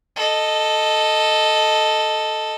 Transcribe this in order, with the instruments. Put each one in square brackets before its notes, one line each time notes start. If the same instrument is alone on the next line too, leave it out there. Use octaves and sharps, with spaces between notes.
[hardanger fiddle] A4 D#5